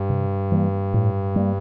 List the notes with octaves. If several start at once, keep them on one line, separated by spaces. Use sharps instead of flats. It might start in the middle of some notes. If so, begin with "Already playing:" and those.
Already playing: G2
C3
E3 G3 A#3
A2
G3 A#3